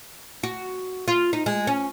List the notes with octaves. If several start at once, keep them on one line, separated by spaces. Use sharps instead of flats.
F#4
F4
D#4
G#3
C#4